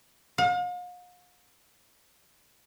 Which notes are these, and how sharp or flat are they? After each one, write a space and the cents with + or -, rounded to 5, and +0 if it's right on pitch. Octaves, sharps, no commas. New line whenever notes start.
F5 +45